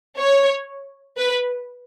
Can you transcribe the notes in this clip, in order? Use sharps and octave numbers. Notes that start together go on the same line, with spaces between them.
C#5
B4